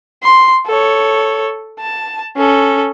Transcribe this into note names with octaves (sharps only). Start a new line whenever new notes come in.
C6
A4 C#5
A5
C#4 A4